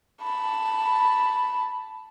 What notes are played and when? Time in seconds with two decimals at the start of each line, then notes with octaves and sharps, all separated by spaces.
0.22 A5 B5